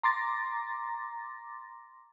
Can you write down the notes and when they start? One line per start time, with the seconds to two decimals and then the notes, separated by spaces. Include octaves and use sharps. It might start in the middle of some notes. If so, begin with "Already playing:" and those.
0.03 A#5 C6 D6 A6 A#6